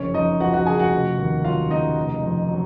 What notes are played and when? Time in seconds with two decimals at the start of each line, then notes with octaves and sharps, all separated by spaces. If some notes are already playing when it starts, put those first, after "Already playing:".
Already playing: F#1 F2 C#4 C#5
0.14 F2 D#4 D#5
0.40 F3 F#4 F#5
0.54 F#4 F#5
0.66 C#3 G#4 G#5
0.79 F#4 F#5
0.92 F1
1.18 D#2
1.44 F#3 F4 F5
1.70 C#3 D#4 D#5
1.97 F1
2.23 F2
2.49 F#3